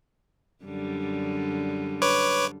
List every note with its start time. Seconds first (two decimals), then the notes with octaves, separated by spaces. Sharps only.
0.64 F#2 D3 G3
2.02 B4 C#5 D6